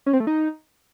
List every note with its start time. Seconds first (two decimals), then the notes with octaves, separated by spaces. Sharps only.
0.06 C#4
0.13 C4
0.20 A3
0.27 D#4